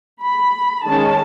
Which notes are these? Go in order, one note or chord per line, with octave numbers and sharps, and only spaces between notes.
B5
D#3 G#3 C#4 A5